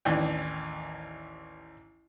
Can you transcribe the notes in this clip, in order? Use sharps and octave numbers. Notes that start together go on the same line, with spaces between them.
A1 D#2 E3 D4 G5